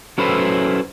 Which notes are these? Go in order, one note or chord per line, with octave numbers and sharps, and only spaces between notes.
F#3 C#4 E4 A4 B4 C5